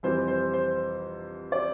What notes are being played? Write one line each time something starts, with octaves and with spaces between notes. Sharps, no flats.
F2 C3 E3 G3 C5
C5
C5
D5